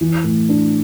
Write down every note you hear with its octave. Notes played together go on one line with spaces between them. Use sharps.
E3
A2
D4